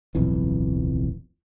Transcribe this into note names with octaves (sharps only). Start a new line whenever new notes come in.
D1 B1 F2 E3